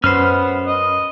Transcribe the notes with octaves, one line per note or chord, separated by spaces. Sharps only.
F#2 B3 C#4 B4 C5 F6
D#5